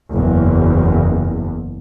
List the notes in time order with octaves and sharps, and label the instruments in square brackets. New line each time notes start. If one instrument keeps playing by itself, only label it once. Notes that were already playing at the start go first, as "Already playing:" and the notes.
[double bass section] F#1 E2